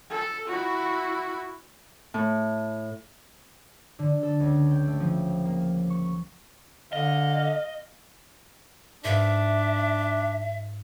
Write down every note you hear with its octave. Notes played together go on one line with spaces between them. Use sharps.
A4
E4 F#4
A2
D3
A4
C#2
G5
A3
F3
A#3
C#6
D3 D#5 F5
G#2 D4 B4 E5 F5